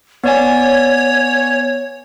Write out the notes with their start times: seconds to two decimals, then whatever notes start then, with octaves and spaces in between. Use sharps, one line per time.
0.24 B3 C#5 D5 G#5